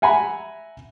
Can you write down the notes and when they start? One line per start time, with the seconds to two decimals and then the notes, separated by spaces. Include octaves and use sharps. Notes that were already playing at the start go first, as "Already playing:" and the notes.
0.02 E5 F#5 G#5 A#5 B5